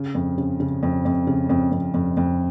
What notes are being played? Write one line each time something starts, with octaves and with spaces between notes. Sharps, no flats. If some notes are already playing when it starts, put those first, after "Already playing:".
Already playing: C#3
F2
C#3
C#3
F2
F2
C#3
F2
F2
F2
F2